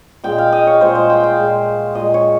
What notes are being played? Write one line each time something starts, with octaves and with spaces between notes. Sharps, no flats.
A#2 G#3 G5
F5
D#5
C#5
A#2 G#3 C5
C5
G5
F5
A#2 G#3
A#2 G#3 D#5
C#5